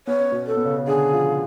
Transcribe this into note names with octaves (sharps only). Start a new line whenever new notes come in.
B3 C#5
C#4
B2 B3
C#4 A4
B3
C#3 C#4
C#4
D3 D4 G#4
F3 F4